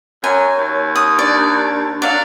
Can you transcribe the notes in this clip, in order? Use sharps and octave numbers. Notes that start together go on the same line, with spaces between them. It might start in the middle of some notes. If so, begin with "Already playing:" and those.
F#2 C#5 G#5
D#2
D#6
D4 D5
F#3 D5 F5